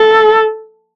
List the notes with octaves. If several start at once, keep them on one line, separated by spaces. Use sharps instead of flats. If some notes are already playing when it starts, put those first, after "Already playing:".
Already playing: A4